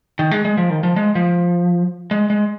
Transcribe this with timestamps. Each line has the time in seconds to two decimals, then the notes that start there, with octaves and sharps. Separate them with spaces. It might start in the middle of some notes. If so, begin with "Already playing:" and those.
0.19 D#3
0.31 G#3
0.45 G#3
0.57 F3
0.70 D#3
0.83 F3
0.96 G#3
1.15 F3
2.11 G#3
2.30 G#3